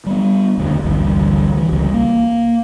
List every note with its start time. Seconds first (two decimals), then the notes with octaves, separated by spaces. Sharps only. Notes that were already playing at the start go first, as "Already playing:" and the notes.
0.06 G3 G#3 B3
0.58 F1 D#2 D3
0.84 A1 D2 G2
1.57 E3
1.72 C#2 G3
1.94 A#3